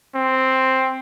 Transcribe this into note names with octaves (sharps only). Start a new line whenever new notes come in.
C4